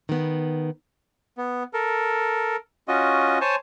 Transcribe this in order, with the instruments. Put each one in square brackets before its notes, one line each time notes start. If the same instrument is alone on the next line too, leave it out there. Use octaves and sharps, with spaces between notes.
[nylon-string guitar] D#3 B3
[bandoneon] B3
A4 A#4
C#4 F4 F#4 D#5
C5 C#5 G#5 A5